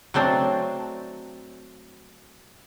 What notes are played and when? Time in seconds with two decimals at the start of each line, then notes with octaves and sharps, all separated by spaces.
0.14 F#3 A3 C4 D4